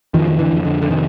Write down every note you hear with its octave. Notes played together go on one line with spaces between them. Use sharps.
F2 D#3 F3
D#3
D3 E3
F2
D3
D3
C3 D#3